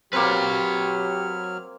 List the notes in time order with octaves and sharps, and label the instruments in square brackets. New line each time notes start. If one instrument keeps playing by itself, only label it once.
[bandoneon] F#3 F6 [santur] A#3 C4 [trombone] G4 [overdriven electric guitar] B4 C#5